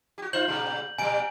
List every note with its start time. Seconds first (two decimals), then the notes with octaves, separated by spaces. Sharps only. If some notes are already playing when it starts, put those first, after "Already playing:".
0.18 F#4 G4
0.33 D#4 F4 C5 G6 F#7
0.47 A#2 C#3 G3
0.98 A#2 G3 G#5 D7